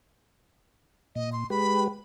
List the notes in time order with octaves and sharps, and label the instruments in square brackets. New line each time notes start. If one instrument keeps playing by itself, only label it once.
[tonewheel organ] A#2 [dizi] D#5
[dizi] C6
[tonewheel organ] G#3 G4 B4 [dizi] B5